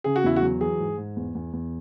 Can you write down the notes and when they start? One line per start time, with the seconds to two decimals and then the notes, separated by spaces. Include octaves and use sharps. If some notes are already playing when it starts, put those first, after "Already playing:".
0.04 C#3 G#4
0.16 F#4
0.24 E2 E4
0.36 F#4
0.42 F#3
0.61 E3 G#4
0.79 G#2
0.97 G#2
1.17 E2
1.35 E2
1.53 E2